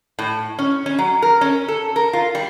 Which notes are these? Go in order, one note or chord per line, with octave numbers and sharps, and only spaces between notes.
A2
C#4
C#4
F#3
A#4
C#4
A4
A#4
F4
G3